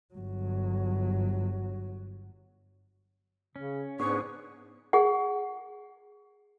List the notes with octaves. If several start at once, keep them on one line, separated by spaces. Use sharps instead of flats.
G1 F#3
C#3 C#4
G#2 B3 D4 G#4 C#6
G#4 F#5